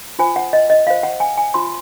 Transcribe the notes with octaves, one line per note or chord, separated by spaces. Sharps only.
F4 C5 G#5
F#5
D#5
D#5
F4 C5 F5
F#5
G#5
G#5
F4 C5 C6